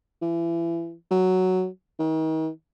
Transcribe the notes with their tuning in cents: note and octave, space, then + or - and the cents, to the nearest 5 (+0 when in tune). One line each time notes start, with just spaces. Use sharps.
E3 +30
F#3 +5
D#3 +40